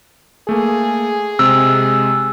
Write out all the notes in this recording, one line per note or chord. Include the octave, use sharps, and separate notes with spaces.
A3 A#3 G#4
C3 G#3 E6